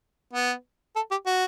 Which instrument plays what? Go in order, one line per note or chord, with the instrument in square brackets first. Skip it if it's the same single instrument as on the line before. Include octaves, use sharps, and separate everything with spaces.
[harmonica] B3
A4
G4
F#4